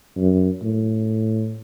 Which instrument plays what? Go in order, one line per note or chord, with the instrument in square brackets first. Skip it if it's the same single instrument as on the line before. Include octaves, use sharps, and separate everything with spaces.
[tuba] F#2
A2